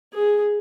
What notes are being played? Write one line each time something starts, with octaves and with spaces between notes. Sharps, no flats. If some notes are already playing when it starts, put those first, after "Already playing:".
G#4